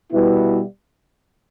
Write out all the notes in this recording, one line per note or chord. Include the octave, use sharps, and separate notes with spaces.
B2 G3 B3 E4